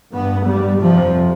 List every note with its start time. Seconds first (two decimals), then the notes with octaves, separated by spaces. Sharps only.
0.14 G2 B3
0.47 G2 G3
0.81 F2 C3 F3